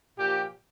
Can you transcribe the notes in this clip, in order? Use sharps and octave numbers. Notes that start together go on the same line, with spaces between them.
A#2 F3 G4